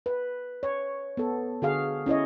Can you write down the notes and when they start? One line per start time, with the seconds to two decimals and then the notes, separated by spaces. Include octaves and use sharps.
0.06 B4
0.63 C#5
1.17 B3 A4
1.62 D3 F#4 G#4 F5
2.06 C#4 E4 C#5 D#5